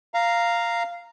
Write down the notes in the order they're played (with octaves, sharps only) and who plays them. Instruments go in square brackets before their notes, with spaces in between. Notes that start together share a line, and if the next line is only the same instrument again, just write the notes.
[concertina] F5 A#5